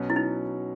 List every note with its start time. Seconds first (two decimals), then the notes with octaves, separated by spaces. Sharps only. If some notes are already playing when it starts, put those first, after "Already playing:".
Already playing: B2 F#3 C#4
0.10 E4
0.16 D#4